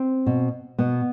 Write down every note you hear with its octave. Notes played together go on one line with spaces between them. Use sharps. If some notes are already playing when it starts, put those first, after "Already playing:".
Already playing: C4
B2
B2 B3